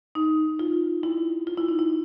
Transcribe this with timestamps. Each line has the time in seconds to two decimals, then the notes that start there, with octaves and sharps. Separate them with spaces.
0.15 D#4
0.59 F4
1.03 E4
1.47 F4
1.58 E4
1.69 D#4
1.79 E4